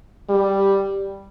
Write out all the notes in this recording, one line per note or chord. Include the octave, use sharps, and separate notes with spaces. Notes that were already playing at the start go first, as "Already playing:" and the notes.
G3